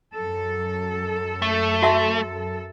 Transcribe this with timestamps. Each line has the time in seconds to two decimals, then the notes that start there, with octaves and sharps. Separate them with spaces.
0.14 F#2 A4
1.42 A3
1.82 F#4 E5 A5